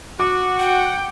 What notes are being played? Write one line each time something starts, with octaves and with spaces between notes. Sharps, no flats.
F#4 D6
F#5 G5